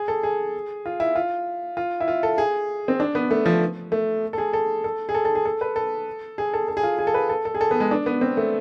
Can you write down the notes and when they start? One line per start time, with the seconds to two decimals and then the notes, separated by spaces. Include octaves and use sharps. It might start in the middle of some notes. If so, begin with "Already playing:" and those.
Already playing: G#4
0.08 A4
0.23 G#4
0.86 F4
1.00 E4
1.16 F4
1.77 F4
2.00 E4
2.08 F4
2.23 A4
2.38 G#4
2.88 C4
3.00 D4
3.15 B3
3.31 A3
3.46 F3
3.92 A3
4.33 A4
4.38 G#4
4.53 A4
4.84 A4
5.09 G#4
5.15 A4
5.25 A4
5.35 G#4
5.45 A4
5.61 B4
5.76 A4
6.38 G#4
6.54 A4
6.68 A4
6.77 G#4
6.83 F4
6.99 G#4
7.07 A4
7.14 B4
7.29 A4
7.45 A4
7.54 G#4
7.61 A4
7.71 B3
7.80 G#3
7.91 D4
8.06 B3
8.21 C4
8.37 A3